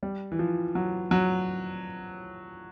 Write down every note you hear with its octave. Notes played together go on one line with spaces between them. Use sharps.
G3
E3
F3
F#3
F#3